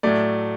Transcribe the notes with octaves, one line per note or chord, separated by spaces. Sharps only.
A2 F#3 A3 D5